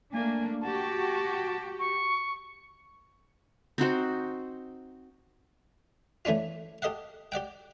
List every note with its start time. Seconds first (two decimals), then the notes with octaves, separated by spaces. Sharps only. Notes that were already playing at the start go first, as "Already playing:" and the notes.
0.13 A3 A#3 D4 G#5
0.61 F#4 G4 A5
1.79 C#6
3.78 C4 D#4 F#4 C5
6.25 E3 A3 C#4 D4 F4
6.82 G4 A4 D#5 F5 F#5
7.32 G4 D5 F#5 G5